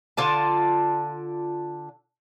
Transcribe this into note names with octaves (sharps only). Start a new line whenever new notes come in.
D3 F4 D5 A5